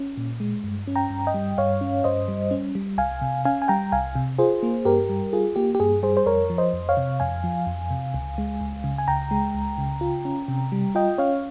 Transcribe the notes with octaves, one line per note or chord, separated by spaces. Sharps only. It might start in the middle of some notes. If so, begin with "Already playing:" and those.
Already playing: C#4
A#2
G#3
G2
C#4
G5 A#5
G2
D#5 G5
G3
G2 C#5 F5
C#4
G2 C5 D#5
G3
C#4
G3
C2 F5 G#5
C3
C#4 F5 G#5
G#5
G3 G5 A#5
C2 F5 G#5
C3
F4 G#4 C5
A#3
G2 G4 A#4
G3
F4 G#4
A#3 G4
G4
G2 G#4
G3 G#4 C5
C5
F2 A#4 C#5
F3
C5 D#5
F2
C#5 F5
C3
F2 F5 G#5
F3
F2
C3
C#2
G#3
C#2
C#3
G#5
C#2 G5 A#5
G#3
C#2
C#3
F4
C#4
C3
G3
F4 D#5 G5
C#4 C#5 F5